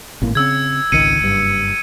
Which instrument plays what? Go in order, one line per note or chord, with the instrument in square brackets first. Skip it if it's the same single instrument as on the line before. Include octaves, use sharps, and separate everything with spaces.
[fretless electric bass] G#1 A2 A#3
[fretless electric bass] C#3 C4 [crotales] E6 G#6
[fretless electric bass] G#1 C#2 D#3 [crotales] C#7 D#7
[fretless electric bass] F#1 G2